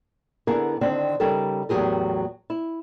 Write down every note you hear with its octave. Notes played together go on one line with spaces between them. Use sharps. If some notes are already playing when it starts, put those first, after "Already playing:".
D3 B3 E4 G#4 A#4
D3 D#3 C4 D4
C#3 G3 D#4 G4 A4 A#4
E2 A2 F#3 G4 G#4 A#4
E4